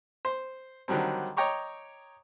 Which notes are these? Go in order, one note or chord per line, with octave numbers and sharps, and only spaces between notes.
C5
D3 D#3 F#3 G3 C4
C#5 D#5 G5 A#5 C#6 D6